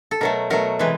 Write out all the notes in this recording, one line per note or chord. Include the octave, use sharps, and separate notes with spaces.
A4
B2 F#3 A3 A#4
B2 F#3 A3 A#4
C3 E3 G#3 B4